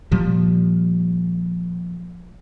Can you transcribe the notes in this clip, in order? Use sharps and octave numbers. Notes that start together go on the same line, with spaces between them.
A#2 F3 G3